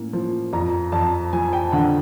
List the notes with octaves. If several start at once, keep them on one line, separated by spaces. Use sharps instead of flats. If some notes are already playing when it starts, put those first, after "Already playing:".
Already playing: A2 A#3 C#4
F3
F2 A#5
F2 A5
F3 G#5
G5
D3 F#5